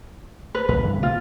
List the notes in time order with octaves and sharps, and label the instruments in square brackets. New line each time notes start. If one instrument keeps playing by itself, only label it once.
[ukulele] B4
[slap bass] A#1 C#3 [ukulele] B4
[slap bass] G2 D3 E3
[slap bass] C3 A#3 [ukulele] F4